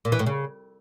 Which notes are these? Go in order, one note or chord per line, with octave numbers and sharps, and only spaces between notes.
A#2
E3
A2
C#3